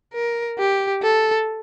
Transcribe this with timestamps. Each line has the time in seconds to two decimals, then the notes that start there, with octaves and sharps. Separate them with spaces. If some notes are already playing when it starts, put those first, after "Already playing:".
0.14 A#4
0.59 G4
1.03 A4